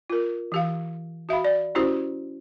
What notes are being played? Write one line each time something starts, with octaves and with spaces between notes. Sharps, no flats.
F4 A#4
E3 G4 F5
F#4 E5 F5 B5
D5
C#4 E4 F#4 G4 C5